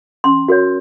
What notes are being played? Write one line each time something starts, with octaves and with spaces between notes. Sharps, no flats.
C#4 C6
F#4 A#4 C#5